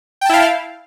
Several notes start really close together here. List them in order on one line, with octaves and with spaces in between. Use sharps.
G5 A5 E4 F5